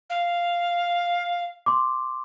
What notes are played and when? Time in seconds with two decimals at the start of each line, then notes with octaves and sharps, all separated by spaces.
0.10 F5
1.66 C6 D6